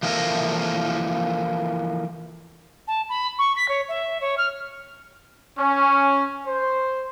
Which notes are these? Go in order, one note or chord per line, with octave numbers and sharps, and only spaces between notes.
E3 F3 A#3 E4 A4 A#4
A5
B5
C#6
B6
C#5
E5
C#5
F6
C#4
C5